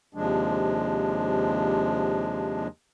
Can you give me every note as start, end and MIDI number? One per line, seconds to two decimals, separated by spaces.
0.14 2.68 39
0.14 2.68 48
0.14 2.68 53
0.14 2.68 56
0.14 2.68 62